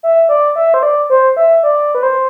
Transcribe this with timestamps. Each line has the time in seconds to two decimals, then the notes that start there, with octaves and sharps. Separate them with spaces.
0.03 E5
0.29 D5
0.56 E5
0.74 C5
0.83 D5
1.10 C5
1.37 E5
1.63 D5
1.95 B4
2.03 C5